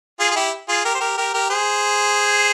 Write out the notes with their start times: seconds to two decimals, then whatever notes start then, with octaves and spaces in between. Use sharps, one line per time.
0.19 F4 G#4
0.31 G#4
0.36 E4 G4
0.68 F4 G#4
0.85 G4 A#4
0.95 C5
1.00 G4 A#4
1.17 G4 A#4
1.34 G4 A#4
1.50 G#4 C5